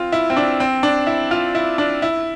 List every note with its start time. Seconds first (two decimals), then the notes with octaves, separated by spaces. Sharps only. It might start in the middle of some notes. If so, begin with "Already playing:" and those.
Already playing: C4 F4
0.12 E4
0.30 C4
0.37 D4
0.60 C4
0.83 D4
1.07 E4
1.31 F4
1.55 E4
1.78 D4
2.02 E4